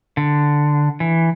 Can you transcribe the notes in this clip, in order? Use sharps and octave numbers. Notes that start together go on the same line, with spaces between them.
D3
E3